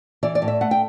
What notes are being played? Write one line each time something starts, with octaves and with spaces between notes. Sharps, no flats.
E3 D5
D5
A2
E5
A3 F#5
G5